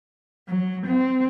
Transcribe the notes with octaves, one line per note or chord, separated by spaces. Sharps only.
F#3
C4